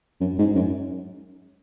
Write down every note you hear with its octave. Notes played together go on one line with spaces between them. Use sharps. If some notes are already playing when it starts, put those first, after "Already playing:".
F#2
G#2
F#2